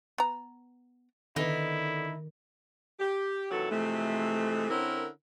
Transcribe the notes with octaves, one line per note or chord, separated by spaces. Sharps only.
B3 A#5
D3 D#3 B3 D#4 E4
G4
D#2 C3 E3 F#3 F#4 A4
C3 E3 F3 G#3 A3
D3 C4 C#4 E4 A#4